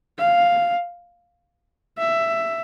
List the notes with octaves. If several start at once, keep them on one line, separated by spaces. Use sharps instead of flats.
F5
E5